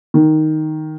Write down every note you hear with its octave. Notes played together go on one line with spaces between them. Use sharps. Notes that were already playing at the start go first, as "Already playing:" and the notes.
D#3